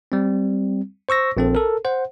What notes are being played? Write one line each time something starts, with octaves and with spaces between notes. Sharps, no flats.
G3 C4
C5 C#6 E6 A#6
A#1 C4 A4
A4 A#4
C5 F#5